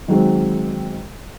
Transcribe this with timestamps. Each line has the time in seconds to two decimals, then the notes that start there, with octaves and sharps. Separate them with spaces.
0.08 D#3 F#3 G#3 C4